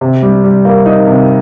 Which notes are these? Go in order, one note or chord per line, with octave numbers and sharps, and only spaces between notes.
C3
G3
G3
A#3
D#4
C3